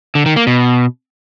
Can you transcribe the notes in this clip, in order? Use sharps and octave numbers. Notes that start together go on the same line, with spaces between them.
D3
D#3
A#3
B2